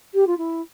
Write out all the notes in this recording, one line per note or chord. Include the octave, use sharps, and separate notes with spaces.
G4
F4
E4